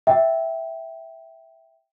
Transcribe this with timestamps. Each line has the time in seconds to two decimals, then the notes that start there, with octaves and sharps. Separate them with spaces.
0.07 E5 G5